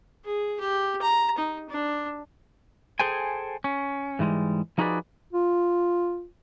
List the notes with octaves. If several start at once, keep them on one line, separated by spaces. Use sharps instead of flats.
G#4
G4
A#5
D#4
D4
G#4 A4 C5 G5 G#5
C#4
G#2 E3 G3 G#3
F3 D#4 F#4 G#4 B4 D5
F4